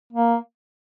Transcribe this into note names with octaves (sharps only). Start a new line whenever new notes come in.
A#3